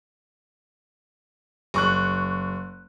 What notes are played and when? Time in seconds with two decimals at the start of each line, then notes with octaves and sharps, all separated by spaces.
1.74 F#1 C#6 F#6